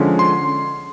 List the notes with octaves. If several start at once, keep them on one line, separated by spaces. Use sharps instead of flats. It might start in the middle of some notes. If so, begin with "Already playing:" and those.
Already playing: D3 F3 G#3 C#4
C6